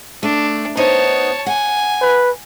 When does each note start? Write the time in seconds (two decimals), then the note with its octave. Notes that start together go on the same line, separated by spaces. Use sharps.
0.23 A3 D4
0.77 B3 D#4 C5 C#5 A5
1.46 F#5 G#5
2.02 B4